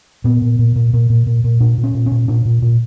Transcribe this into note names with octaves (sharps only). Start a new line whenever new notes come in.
A#2 B3
A#2
A#2
A#2
A#2
A#2
A#2
A#2
A#2 D4
A#2
C#4
A#2
C#4
A#2
A#2 D4
A#2
A#2